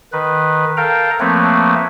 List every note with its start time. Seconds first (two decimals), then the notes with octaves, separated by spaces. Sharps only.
0.12 D#3 B4
0.77 A4 A#4 F5 G5 A#5
1.20 F3 A3 A#3 C4 B4 C#5